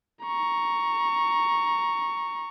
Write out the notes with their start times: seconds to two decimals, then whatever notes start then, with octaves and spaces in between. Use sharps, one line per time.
0.24 A#5 C#6